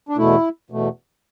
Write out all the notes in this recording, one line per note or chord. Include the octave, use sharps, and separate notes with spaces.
D4
E2 B2 A3 E4
E2 B2 A3